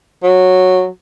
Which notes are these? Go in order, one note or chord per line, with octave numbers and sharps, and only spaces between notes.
F#3